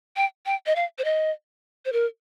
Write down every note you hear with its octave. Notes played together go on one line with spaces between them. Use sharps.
G5
G5
D#5
F5
C5
D#5
C5
A#4